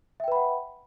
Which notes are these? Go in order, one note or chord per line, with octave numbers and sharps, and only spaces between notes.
B4 E5 F#5 G5 B5